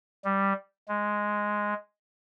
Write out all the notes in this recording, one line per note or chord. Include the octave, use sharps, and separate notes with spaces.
G3
G#3